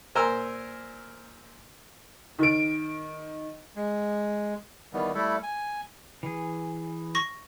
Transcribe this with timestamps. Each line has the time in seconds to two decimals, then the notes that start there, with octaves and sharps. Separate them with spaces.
0.15 A#2 A#4 C5 G#5 A#5 E6
2.39 D#3 D7
3.76 G#3
4.93 D#3 E3 G3 B3
5.14 G3 A3 E4 A4
5.43 G#5
6.23 E3 G#4
7.15 C#6 A#6